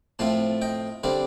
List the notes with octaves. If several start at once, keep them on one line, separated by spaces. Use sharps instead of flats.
A2 F3 A3 C4 F5 A5
D#5 G5
D3 G3 C4 D5 F5